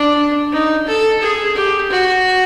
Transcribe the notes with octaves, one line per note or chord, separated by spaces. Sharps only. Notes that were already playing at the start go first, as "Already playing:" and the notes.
Already playing: D4
D#4
A4
G#4
G4
F#4